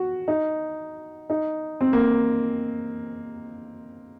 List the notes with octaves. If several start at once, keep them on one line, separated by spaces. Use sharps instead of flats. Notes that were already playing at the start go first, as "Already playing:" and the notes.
Already playing: F#4
D#4
D#4
C4
A#3